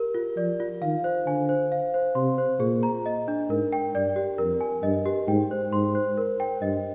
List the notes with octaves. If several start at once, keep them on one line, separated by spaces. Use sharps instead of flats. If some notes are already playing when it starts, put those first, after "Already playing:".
Already playing: G4 A#4
F4
F3 D5
F4
D#3 F5
C5
D3 G#5
C5
F5
C5
C3 C6
C5
A#2 G#4
A#5
D#5
D4
G#2 A#4
G5
G2 D5
G4
F2 A#4
G#5
G2 D#5
G4
G#2 G5
C5
G#2 C6
C5
A#4
G5
G2 D#5